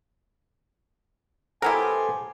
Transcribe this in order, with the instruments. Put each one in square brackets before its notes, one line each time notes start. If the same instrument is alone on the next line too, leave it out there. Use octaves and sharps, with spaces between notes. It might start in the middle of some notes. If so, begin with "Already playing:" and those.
[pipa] F#3 B3 G4 [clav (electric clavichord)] E4 A#4 [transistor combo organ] A4 C5 [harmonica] G#5